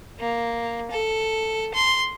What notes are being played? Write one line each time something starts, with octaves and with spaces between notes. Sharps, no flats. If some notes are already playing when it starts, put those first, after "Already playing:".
A#3
A4
C6